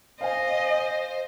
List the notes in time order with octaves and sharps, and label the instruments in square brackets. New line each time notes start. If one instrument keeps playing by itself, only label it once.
[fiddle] C5 [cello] D#5 [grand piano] F5 G#5